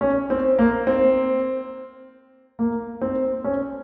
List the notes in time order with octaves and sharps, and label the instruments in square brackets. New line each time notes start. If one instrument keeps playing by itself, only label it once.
[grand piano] C#4
C4
A#3
C4
A#3
C4
C#4